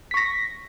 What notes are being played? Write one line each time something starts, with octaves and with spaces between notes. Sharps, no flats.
C#6 A#6 B6